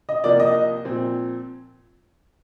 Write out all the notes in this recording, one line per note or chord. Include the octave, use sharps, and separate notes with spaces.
D#5
C2 C3 F3 A#3 D5
D#5
A#2 F3 C4